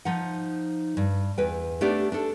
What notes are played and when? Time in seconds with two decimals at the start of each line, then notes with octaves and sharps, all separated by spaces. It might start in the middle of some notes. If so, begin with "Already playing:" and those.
0.05 F3 D#4 F#5
0.97 G2
1.38 E2 B4 G5
1.81 A3 B3 D4 G4 D5
2.12 D4 A4